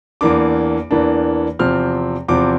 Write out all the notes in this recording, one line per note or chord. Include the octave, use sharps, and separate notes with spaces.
E2 E3 A#3 D4 D6
E2 E3 A#3 D4
E2 C3 F3 C4 F6
E2 C3 F3 C4 D6